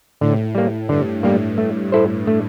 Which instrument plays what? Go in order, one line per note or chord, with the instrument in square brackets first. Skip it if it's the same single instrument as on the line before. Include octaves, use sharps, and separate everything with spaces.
[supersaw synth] A2 [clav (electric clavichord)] D3
[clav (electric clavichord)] G3 A#3
[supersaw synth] G2 [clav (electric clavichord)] D3
[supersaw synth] A2 [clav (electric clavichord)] G3 A#3
[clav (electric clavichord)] A3
E4 A4 C5
A3